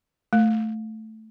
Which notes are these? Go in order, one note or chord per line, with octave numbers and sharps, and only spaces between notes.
A3